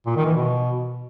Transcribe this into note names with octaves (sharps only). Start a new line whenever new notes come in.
A#2
D#3
E3
B2